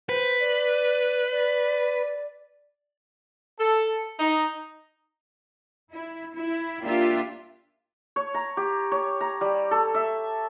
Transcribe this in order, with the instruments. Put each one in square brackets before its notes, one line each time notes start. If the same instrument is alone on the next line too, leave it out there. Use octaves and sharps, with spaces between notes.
[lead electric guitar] B4 [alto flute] C5
[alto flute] D5
D5
[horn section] A4
D#4
[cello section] E4
E4
A#3 D4 F4 G4 E5
[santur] C#5
A#5
G4
C#5
A#5
G3
A4
E5